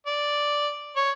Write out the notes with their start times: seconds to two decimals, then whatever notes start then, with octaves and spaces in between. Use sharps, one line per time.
0.07 D5
0.96 C#5